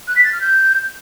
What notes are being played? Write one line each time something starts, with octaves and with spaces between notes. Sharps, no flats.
F#6
B6
A6
F6
G6